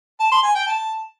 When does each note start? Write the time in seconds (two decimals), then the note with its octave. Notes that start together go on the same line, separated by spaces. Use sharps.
0.20 A5
0.32 C6
0.43 G#5
0.55 G5
0.67 A5